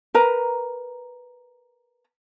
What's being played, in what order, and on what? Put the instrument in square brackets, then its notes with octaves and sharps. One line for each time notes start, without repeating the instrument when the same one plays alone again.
[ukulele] A#4 B4 A#5